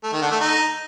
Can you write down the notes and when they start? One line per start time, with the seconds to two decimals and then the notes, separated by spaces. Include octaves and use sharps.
0.03 A3
0.13 D#3
0.22 D3
0.31 A3
0.40 D#4